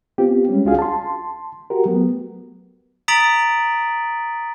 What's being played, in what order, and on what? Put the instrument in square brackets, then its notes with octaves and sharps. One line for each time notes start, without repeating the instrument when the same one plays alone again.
[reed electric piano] B3 C4 F4 G4
G3 G#3 C#4
C#2 D4 F4 F#4 G#4 F5
A5 C6
F#4 G4 A#4
F#3 A3 B3
[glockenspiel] A#5 D#6 A6 B6 D7 F#7